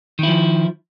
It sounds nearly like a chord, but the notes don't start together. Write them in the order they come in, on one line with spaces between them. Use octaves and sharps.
D#3 E4 F3